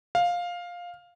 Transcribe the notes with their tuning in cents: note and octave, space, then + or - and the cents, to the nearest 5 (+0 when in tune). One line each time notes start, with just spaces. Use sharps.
F5 +10